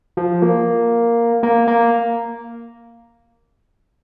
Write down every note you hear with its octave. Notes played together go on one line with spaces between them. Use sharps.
F3
A#3
A#3
A#3